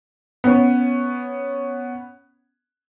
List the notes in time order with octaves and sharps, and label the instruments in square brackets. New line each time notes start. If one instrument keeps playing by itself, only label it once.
[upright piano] B3 C#4